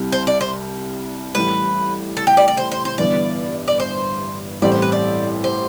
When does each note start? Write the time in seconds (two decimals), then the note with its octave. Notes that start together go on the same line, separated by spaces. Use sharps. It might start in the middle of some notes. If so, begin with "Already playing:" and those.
Already playing: C2 C3 G3
0.12 C5
0.27 D5
0.41 C5
1.35 A1 A2 G3 B4
2.17 A4
2.27 G4
2.37 D5
2.48 D5
2.57 C5
2.72 C5
2.85 C5
2.98 G1 G2 E3 B3 D5
3.68 D5
3.80 C5
4.62 A1 A2 G3 C4 G4 D5
4.72 C5
4.82 B4
4.92 D5
5.44 C5